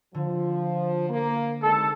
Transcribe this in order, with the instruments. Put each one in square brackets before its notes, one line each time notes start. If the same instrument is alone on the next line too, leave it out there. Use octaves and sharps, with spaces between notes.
[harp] D3 [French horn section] F3
[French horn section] A#3
[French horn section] C3 D#3 G#3 [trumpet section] A4